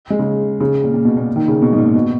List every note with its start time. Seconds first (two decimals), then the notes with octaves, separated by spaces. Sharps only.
0.10 G#3
0.19 C#3
0.60 C#3
0.84 A#2
0.94 A#2
1.05 B2
1.17 A#2
1.36 D#3
1.48 C#3
1.62 B2
1.73 G#2
1.78 A#2
1.95 B2